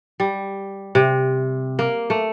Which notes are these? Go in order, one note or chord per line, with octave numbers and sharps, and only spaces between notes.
G3
C3
A#3
A3